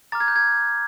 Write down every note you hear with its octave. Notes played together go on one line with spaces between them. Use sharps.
A#5 D6 F6 A6
G#6
G6
G#6